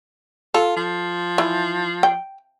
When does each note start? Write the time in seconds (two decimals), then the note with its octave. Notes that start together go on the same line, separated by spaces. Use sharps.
0.54 F4 A4
0.77 F3
1.38 E3
2.03 G5